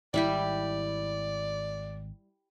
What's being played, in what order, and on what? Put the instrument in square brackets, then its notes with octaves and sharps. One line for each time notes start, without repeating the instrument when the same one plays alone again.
[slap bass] G#1 [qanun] G3 E4 G4 [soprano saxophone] D5